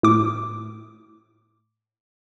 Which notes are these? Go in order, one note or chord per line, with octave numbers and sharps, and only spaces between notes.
A2 D6